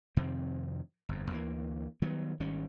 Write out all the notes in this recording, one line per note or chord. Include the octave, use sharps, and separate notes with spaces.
F2 C3 D#3 C4
G1 F2
D2 E3 A#3
D#3 F#3 G3 B3
G#1 D#3 G3 C#4